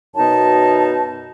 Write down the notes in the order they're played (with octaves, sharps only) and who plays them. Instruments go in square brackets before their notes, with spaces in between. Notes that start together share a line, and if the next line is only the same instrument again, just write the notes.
[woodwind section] F#2 B2 D#4 A5